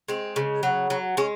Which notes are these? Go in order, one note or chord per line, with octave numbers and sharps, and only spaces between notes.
G#3 C4
C#3
F#3
F#3
G#3 C#4